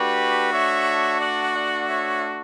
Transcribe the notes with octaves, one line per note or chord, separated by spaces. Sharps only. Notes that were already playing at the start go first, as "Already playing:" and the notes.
Already playing: A3 D4 F#4 G4 B4
C#5 E5
D5 F#5
D5 F#5
C#5 E5